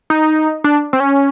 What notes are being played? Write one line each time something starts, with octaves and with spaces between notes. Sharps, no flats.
D#4
D4
C4
C#4